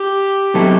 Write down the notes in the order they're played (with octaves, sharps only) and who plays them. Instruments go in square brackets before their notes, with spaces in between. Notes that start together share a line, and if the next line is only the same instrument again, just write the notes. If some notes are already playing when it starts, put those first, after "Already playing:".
Already playing: [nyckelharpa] G4
[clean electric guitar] C3 F#3 B3 E4 A4